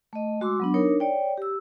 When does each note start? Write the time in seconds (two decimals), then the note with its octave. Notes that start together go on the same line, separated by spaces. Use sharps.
0.13 A3 D#5
0.41 G#3 F#4 C6 D6 E6
0.60 F#3 B3 D4
0.74 D4 D#4 A#4 C#5
1.00 C#5 D5 G5
1.37 G4 E6